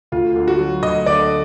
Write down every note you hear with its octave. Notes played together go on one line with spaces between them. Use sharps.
D2 F4
D3
F#4
F#3
D2 D#5
D3 D5